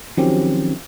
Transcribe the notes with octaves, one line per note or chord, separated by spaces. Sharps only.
D#3 F3 F#3 C4 C#4 G4